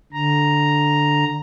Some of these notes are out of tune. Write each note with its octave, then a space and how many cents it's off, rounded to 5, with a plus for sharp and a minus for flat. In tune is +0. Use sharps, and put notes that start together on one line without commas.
D3 +0 A#5 +0